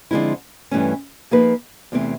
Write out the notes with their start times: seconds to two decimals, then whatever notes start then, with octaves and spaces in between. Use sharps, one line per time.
0.11 D3 F3 G#3 C4 E4
0.71 G2 E3 A3 C#4
1.31 F3 A#3 D#4 G#4 B4
1.92 E2 C3 E3 A3 C4